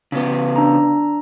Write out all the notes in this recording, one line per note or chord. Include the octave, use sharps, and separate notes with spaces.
C#3 B3
D4 A#5